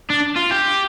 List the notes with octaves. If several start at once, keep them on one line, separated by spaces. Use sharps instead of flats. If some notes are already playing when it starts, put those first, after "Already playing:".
D4
F4
G4